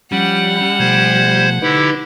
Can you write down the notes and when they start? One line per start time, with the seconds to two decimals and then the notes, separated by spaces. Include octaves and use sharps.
0.12 F3 G3 C#4 F#5
0.79 B2 F3 A3 C5 G#6
1.62 D3 D#4 E4 G4 B4 D6